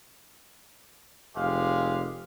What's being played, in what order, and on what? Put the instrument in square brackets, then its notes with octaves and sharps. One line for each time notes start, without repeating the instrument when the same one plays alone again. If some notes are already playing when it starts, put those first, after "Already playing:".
[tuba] F1 [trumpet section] G#3 G4 F5